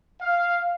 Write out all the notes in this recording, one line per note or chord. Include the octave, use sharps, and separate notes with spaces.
F5